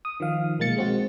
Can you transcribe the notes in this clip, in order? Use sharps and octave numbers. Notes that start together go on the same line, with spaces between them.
D#6
D#3 F3 F5
B1 G#3 A#3 A6 C#7
G#3 C4 F#4